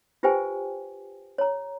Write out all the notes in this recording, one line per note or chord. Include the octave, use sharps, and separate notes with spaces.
F4 G4 B4 C5 G5 G#5
C#5 A#5